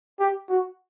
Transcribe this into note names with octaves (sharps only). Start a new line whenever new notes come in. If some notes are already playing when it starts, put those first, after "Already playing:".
G4
F#4